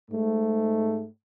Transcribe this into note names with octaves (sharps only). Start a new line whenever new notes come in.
G#2 A3